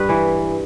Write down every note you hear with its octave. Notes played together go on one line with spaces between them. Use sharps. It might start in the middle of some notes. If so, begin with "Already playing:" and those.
Already playing: G2 B4
E3